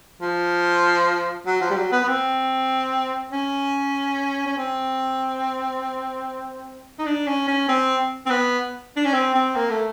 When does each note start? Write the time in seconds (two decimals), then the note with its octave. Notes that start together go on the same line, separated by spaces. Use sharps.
0.21 F3
1.46 F#3
1.61 F3
1.70 G3
1.77 F#3
1.92 B3
2.04 B3
2.08 C4
3.32 C#4
4.46 C#4
4.57 C4
6.99 D#4
7.06 D4
7.27 C#4
7.48 C#4
7.69 C4
8.26 C4
8.30 B3
8.96 D4
9.05 C#4
9.13 C4
9.35 C4
9.55 A#3
9.70 A3